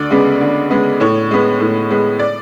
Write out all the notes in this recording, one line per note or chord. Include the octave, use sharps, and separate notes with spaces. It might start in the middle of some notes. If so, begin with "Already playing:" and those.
Already playing: D2 D5
C#3 G#3 B3
D2
C#3 G#3 B3
A2 C#5
G#3 B3
A2
G#3 B3
D5